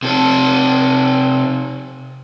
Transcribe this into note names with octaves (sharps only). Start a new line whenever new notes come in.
C3 A4